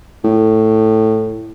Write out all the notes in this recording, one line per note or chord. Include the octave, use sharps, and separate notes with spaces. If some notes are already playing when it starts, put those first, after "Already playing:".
A2